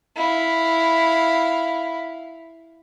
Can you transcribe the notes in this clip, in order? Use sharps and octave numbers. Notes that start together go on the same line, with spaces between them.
E4 F5